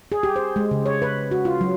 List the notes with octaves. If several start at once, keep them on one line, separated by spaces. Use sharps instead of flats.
G#4
G4
C5
G#3
C#3
C#5
B4
F#4
F4
F#3